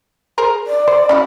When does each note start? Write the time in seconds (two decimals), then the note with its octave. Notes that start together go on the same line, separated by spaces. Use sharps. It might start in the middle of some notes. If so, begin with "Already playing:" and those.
0.38 G#4 A#4 C5
0.67 D5
0.88 C5
1.09 C#4 E4 F#4